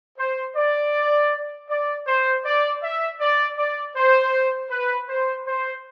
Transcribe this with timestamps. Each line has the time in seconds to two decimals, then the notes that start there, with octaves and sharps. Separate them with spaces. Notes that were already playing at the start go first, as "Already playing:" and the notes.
0.18 C5
0.56 D5
1.69 D5
2.07 C5
2.45 D5
2.82 E5
3.20 D5
3.58 D5
3.96 C5
4.70 B4
5.09 C5
5.47 C5